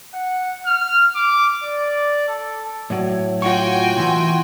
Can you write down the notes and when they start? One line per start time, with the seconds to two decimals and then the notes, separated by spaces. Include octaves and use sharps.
0.14 F#5
0.66 F6
1.15 D6
1.64 D5
2.28 A4
2.90 A2 F#3 C#5 D5
3.42 F4 F#4 G5 G#5 C#6
3.97 B2 E3 C6